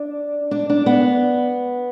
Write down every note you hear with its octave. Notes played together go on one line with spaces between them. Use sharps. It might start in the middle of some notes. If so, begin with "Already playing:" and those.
Already playing: D4
D4
D4
B3